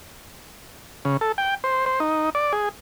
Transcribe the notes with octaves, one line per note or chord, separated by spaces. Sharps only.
C#3
A4
G5
C5
C5
D#4
D5
G#4